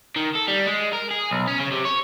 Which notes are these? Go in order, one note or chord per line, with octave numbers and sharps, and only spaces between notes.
D#3
A4
G3
G#3
A#4
G#4
B1
C#4
C#3
C3
C#5